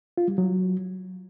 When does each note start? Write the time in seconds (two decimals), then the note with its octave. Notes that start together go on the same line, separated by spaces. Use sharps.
0.18 F4
0.28 G3
0.38 F#3